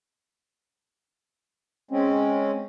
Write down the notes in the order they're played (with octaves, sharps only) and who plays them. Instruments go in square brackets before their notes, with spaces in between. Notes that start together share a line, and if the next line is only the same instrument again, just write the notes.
[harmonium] G#3 C4 C#4